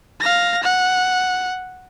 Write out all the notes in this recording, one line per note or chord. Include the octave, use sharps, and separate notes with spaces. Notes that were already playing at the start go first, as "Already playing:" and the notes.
F5 A#6
F#5